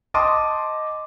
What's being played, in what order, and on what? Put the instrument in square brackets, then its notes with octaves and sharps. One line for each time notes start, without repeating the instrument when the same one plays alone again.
[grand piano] D#5 G5 A5 C6 D6 D#6